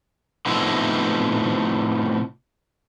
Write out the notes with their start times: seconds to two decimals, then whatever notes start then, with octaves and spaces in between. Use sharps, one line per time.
0.46 A2 C3 F3 B3 D#4 E4